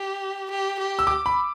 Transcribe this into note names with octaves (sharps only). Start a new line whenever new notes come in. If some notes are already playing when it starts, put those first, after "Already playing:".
Already playing: G4
G4
G4
E6
D6
B5